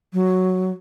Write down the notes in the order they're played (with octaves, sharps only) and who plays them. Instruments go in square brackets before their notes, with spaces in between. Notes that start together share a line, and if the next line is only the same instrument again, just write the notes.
[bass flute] F#3